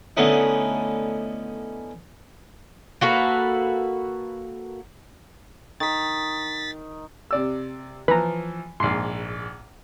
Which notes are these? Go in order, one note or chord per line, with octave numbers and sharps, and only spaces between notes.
D3 A3 B3 C#4 D#4 E4
A#3 F#4 A4 B4
D#3 A6 B6
C3 D5 E6
E3 F3 B4 A#5
A#1 G#2 C6 C7